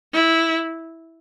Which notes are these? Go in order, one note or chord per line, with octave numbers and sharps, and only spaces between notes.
E4